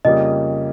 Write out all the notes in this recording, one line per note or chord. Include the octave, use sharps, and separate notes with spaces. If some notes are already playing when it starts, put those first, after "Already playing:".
F2 C#3 G3 A#3 D#5